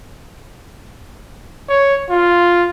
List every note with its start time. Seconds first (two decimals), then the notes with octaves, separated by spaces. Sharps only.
1.69 C#5
2.10 F4